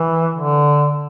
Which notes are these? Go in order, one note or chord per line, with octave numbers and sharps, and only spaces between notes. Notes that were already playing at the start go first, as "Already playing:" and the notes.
Already playing: E3
D3